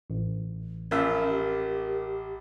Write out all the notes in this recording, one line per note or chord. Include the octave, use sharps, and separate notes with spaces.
A1
A#1 C#4 F4 A#4 E5
G4